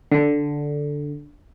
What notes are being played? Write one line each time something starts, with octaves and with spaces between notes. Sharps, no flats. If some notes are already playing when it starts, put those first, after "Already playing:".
D3